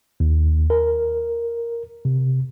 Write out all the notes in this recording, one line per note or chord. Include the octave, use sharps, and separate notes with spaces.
D#2
A#4
C3